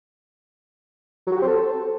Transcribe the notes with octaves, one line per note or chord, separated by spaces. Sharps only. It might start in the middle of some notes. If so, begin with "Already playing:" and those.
F#3
F#4
G4
C4
A4